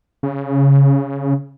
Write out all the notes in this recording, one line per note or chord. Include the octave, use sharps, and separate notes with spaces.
C#3